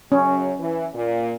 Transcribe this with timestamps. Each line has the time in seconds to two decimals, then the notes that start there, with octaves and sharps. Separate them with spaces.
0.12 F#2 C#3 F#3 C#4
0.60 E3
0.94 A#2